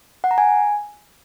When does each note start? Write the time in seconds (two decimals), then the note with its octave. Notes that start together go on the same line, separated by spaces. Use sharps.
0.24 F#5
0.31 A#5
0.38 G#5